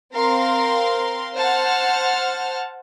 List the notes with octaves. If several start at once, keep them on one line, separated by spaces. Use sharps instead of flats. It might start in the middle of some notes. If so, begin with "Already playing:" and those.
C4 A#4 F5 C6
C5 F#5 A5 F6